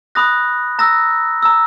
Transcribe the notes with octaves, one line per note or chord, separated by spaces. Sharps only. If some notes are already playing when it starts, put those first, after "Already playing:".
B5 D#6 F#6 A#6
A#5 E6 A#6
A#5 E6